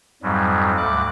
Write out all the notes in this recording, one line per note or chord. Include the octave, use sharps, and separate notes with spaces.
F2 G#2 F#3 G3
D2 D6 F#6